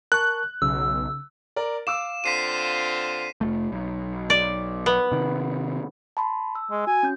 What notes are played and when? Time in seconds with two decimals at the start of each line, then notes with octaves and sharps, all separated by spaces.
0.12 A#4 A5 C#6 F#6
0.62 B1 C#3 E6
1.56 A#4 D5
1.87 F5 D6 E6 E7
2.24 D3 C4 F4 B6 C7 D#7
3.41 F1 A3
3.72 B1
4.30 D5
4.86 B3
5.12 C3 D#3
6.17 A5 B5 C6
6.55 E6
6.71 G#3
6.87 F#4 G#5
7.03 C#4 G6